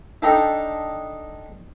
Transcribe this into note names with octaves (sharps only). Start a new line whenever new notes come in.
D4 D#4 A4 D#5 G5 A#5